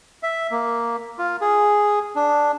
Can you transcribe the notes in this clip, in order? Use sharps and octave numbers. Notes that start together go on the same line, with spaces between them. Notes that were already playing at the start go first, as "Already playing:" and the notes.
E5
A#3
F4
G#4
D4